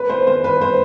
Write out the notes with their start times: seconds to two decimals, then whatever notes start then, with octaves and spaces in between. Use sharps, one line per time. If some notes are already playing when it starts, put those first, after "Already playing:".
Already playing: B4
0.10 C5
0.27 C5
0.44 B4
0.61 C5